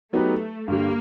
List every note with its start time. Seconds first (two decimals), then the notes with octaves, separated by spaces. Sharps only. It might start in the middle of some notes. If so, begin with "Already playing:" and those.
0.13 F#3 A3 B3 D#4 G4 B4
0.68 G2 D3 G3 A#3